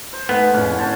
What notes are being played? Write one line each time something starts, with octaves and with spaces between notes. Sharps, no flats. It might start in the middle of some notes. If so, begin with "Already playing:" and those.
C5
A3 B3 D#4 F#5 G#5
F2 A2 C#3 C#4
D3 C5 C#5 A5